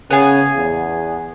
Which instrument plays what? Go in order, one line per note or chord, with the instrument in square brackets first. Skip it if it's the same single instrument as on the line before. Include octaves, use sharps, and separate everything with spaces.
[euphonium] C#3 [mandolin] B3 G#4
[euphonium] E2